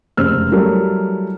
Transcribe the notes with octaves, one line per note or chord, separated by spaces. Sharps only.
F1 C#2 F#2 C5 E6 F6
F#3 G3 A3 E4 A#4